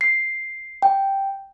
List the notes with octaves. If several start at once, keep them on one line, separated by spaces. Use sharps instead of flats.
C7
G5